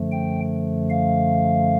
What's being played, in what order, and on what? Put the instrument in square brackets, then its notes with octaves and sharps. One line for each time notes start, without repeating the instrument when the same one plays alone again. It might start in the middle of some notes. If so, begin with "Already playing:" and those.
Already playing: [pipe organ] F#2 D3 F3 A3
G5
F5